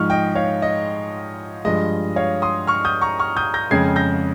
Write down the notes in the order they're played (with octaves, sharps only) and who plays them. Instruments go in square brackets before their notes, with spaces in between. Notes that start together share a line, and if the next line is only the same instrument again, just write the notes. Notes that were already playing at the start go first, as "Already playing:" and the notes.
Already playing: [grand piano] G#2 F3 G#3 C#6 F6
D#5 G5
C#5 F5
D#5
G2 F3 G#3 D#5
C#5 F5
C6 D#6
C#6 F6
D#6 G6
A#5 C#6
C#6 F6
D#6 G6
G6 A#6
F2 C#3 G#3 C#4 G#6 C7
G6 A#6